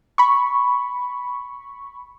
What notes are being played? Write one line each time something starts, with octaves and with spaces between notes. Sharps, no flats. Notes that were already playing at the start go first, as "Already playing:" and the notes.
B5 C#6